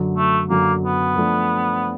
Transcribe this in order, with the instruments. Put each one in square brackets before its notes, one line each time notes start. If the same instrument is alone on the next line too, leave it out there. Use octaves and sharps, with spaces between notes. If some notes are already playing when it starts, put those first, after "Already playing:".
Already playing: [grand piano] F#2 D3 F#3
[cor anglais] A3
[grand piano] F#2 D3 F#3 [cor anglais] A#3
[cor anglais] B3
[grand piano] F3 A3 D4